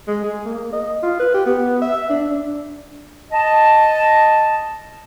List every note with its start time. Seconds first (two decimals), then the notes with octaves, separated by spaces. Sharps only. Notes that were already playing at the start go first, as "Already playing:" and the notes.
0.08 G#3
0.24 G#4
0.45 A#3
0.72 D#5
1.03 F4
1.19 B4
1.34 G4
1.46 B3
1.82 E5
2.09 D4
2.30 D4
3.32 D#5 A5